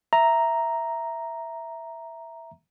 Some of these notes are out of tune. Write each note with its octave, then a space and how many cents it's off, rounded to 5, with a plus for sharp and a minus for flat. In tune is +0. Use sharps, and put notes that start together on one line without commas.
E5 +0 A#5 +0